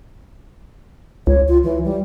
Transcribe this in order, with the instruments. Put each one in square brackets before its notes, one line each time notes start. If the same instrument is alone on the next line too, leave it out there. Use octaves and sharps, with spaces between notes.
[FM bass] C#2 [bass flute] C#5
[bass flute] F4
E3
G3